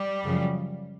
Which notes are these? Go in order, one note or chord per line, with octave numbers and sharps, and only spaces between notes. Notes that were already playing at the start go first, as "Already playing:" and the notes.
Already playing: G3
F#2 C#3 F3